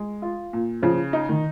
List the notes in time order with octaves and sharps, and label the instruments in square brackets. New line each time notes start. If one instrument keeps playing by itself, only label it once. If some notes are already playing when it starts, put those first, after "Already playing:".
Already playing: [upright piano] G#3
F4
A#2
[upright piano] C#3 [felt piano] F3
[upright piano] D#4
[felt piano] D#3